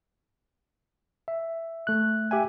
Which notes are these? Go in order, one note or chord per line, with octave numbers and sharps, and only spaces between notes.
E5
A3 F#6
G4 E5 G#5